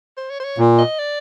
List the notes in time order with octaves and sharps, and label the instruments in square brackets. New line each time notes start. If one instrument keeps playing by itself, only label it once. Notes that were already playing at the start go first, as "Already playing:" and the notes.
[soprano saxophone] C5
C#5
C5
C#5
[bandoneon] A#2
[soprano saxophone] D#5
D5